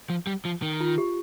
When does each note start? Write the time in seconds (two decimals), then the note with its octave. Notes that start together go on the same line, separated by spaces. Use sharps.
0.10 F3
0.27 G3
0.45 F3
0.62 D#3
0.80 F4
0.98 G4